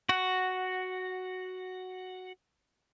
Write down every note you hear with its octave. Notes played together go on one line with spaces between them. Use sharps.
F#4 F#5